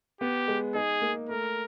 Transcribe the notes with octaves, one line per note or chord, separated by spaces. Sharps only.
B3 G4
G#3
D#4 G#4
A#3
A3 A#4